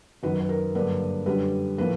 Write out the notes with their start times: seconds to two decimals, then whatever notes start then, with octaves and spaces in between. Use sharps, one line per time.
0.23 F#2 D#3 F#3 B4
0.41 B4
0.49 A#4
0.75 G2 D3 F#3 A#3 B4
1.26 F#2 D3 G3 B4
1.78 A2 F3 A#3 B4